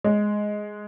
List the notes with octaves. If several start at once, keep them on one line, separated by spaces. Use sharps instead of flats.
G#3